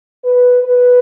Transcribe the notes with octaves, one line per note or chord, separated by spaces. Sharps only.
B4
B4